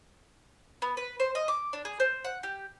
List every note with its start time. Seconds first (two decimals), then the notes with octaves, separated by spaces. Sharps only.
0.82 B3
0.97 B4
1.20 C5
1.35 D#5
1.48 D6
1.73 D4
1.85 G#4
2.00 C5
2.25 F#5
2.43 G4